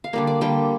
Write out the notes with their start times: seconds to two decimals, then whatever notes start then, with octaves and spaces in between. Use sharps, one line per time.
0.04 F5
0.13 D3 G3 A#3 D5
0.27 D5
0.41 D3 G3 A#3 G5